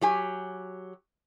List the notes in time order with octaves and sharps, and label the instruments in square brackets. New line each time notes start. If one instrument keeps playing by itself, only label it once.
[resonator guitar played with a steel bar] F#3 G4 G#5